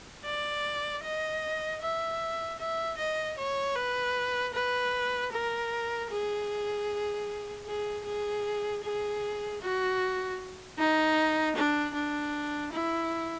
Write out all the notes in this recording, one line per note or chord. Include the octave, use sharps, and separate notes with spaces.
D5
D#5
E5
E5
D#5
C#5
B4
B4
A#4
G#4
G#4
G#4
G#4
F#4
D#4
D4
D4
E4